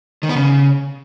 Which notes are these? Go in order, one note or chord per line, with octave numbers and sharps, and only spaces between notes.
D#3
B3
C#3